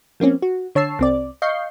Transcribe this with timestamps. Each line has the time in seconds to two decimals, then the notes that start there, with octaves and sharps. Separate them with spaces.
0.20 F3 A#3 C4 C#4
0.42 F#4
0.75 D3 C#5 A5 E6 C7
0.99 C2 C4 D5
1.42 D#5 F5 C#6 G6 C7